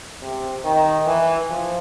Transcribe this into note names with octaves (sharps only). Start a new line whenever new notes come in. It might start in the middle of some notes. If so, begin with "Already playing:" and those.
C3
D#3
E3
F3